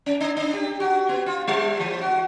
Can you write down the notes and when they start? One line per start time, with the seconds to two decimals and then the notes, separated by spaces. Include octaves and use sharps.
0.06 C#4
0.21 D4
0.37 D4
0.53 G4
0.80 F#4
1.09 B3
1.26 F4
1.47 G3
1.80 E3
2.01 F#4